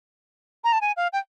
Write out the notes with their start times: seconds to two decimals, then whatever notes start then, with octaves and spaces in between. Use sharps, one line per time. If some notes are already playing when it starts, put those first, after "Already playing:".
0.64 A#5
0.73 A5
0.81 G#5
0.97 F5
1.13 G5